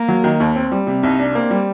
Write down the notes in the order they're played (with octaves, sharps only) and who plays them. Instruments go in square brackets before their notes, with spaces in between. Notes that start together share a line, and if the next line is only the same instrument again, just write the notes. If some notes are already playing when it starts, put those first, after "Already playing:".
Already playing: [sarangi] A#3
[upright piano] F#3
D#3
D#2
C4
G3
C3
[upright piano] C2 [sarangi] D#4
[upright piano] D4
[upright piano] A#3 [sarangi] C4
[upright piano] G3